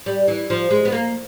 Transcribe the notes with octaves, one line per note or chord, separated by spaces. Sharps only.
G3
E3
F3
G#3
B3
A#3